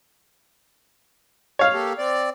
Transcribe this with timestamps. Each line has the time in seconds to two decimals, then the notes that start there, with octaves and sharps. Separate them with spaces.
1.59 C#5 F5
1.73 A#3 G4 A4
1.98 C4 D5